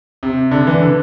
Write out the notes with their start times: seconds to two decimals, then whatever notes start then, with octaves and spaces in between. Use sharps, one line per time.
0.23 C3
0.51 D3
0.67 E3
0.82 D3